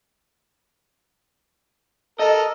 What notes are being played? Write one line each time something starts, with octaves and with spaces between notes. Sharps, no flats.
A4 A#4 D#5